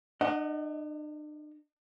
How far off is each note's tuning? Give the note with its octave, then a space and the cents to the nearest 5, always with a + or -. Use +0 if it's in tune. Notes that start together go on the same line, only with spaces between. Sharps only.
D4 +45 D#5 +15 F#5 +0